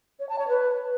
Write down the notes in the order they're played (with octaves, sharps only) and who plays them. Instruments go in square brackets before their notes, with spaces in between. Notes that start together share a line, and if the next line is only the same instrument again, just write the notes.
[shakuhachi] C#5
A5
C#5
B4